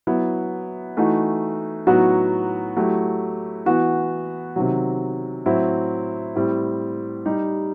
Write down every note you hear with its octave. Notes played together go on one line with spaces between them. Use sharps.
F#3 B3 E4
E3 A3 D#4 F#4
A2 F#3 B3 D#4 F#4
F#3 A3 E4 G4
E3 B3 F#4
C3 D#3 F#3
A2 F#3 C4 E4
A2 G3 C4
G3 D#4 G4